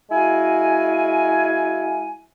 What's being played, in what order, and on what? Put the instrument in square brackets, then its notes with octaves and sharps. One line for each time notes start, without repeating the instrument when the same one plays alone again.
[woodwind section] G#3 E4 F#4 F5 G#5